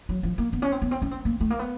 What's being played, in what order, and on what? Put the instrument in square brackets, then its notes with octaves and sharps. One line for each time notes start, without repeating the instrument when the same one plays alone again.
[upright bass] F#3
F3
A#3
B3
C#4
C4
B3
C4
C#4
C4
A#3
A3
A#3
B3